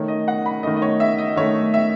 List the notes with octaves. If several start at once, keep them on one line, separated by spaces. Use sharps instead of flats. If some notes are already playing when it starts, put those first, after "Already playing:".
Already playing: D#3 A3 C#5
D#5
F#5
B5
D#3 A3 D#5
D#5
C#5
E5
D#5
D#3 A3 C#5
E5